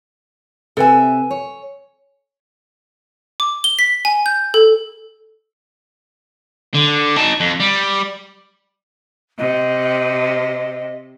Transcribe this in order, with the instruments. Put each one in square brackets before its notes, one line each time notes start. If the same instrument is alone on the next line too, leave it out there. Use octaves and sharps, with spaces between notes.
[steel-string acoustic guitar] C3 B4 E5 [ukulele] A4 G#5
[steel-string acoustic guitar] C#5
[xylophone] D6
G7
B6
G#5
G6
A4
[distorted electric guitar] D3
D#4 A5
F2
G3
[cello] C3 [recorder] D#5